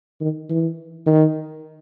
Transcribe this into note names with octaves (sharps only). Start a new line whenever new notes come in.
D#3
E3
D#3